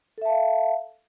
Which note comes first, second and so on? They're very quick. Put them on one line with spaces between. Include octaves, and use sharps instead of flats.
A4 E5 A5 F5